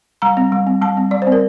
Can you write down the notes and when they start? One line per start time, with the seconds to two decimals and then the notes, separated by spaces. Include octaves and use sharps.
0.22 G3 A#5
0.37 C4
0.52 G3
0.67 C4
0.82 G3 A5
0.97 C4
1.11 G3 D5
1.22 C5
1.27 C4
1.32 A#4